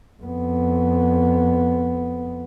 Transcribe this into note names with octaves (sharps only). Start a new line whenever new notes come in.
F2 B3